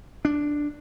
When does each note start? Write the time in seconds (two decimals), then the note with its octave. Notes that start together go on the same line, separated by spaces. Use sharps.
0.25 D4